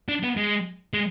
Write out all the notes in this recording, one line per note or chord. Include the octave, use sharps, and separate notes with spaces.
D4
B3
G#3
G#3